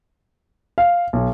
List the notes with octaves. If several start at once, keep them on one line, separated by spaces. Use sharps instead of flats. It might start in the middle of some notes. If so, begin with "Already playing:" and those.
F5
B1